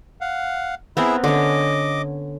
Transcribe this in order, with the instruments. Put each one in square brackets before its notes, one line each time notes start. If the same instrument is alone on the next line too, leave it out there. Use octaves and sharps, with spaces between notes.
[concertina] F5 F#5
[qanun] B3 C4 A#4 [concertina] E4 G#4 E5
[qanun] D3 C#4 [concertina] D#5 D6